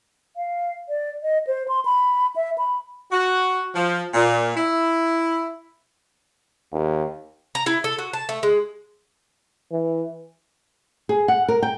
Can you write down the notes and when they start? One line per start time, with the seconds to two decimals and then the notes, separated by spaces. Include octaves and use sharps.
0.37 F5
0.89 D5
1.23 D#5
1.47 C5
1.68 C6
1.85 B5
2.36 E5
2.58 B5
3.12 F#4
3.76 F3
4.14 A#2
4.56 E4
6.72 D#2
7.55 A#5
7.66 E4
7.84 A4
7.98 F#4
8.14 A5
8.29 A3
8.43 G#3
9.72 E3
11.09 G#4
11.28 F#5
11.48 A#4
11.63 G5